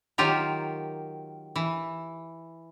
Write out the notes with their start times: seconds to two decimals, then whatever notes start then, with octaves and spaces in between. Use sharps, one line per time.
0.18 D#3 F#3 F4 G4 A#4
1.56 E3